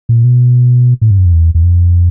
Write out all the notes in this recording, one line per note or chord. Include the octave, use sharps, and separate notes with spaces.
A#2
B2
A2
G2
F#2
F2
E2
E2
F2